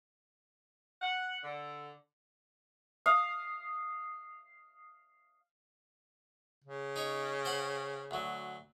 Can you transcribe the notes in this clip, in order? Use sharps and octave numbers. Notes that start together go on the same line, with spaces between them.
F#5
D3
F5 D#6
C#3
D#4 C#5
C5 F#5 B5
D2 F#3